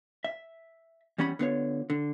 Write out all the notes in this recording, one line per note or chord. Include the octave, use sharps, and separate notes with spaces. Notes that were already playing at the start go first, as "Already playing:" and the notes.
E5
E2 G3 C#4 F#5 B5
D3 B3 F4 C#5
D3